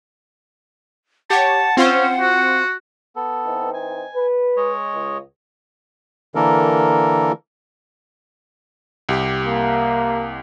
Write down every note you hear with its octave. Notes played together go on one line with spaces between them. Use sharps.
G4 C#5 F#5 A5
C4 C#4 F4 C5
F#4
B3 A4
E3 C4 D#4
G#5
B4
G#3 C#5 D#5
C#2
D3 E3 A#3 A4 A#4
C2 G4
A#3